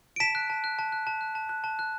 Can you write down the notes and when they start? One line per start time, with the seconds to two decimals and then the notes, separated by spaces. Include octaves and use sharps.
0.16 D7
0.20 A5 B6 E7
0.35 F#6
0.50 A5
0.64 F#6
0.79 A5
0.92 F#6
1.07 A5
1.21 F#6
1.35 A5
1.49 F#6
1.64 A5
1.79 F#6